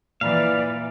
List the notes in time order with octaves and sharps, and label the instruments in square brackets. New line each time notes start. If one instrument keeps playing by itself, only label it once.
[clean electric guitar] A#2 [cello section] E3 [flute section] D5 [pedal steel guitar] F5